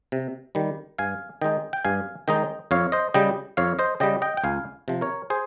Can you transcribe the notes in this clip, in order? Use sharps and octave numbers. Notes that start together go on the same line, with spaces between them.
C3
D#3 G3
G2 F5 G#5
D#3 G#3 D#4 D#5 G5
G5
G2 F5 G#5
D#3 G#3 D#4 D#5 G5
F2 C#5 F5
C5 D#5
C#3 G3 D#5 G5
F2 C#5 F5
C5 D#5
C#3 G3 D#5 G5
D#5 G5
G5
C#2 F5 G#5
C3 F3
A#4 C#5
G#4 C5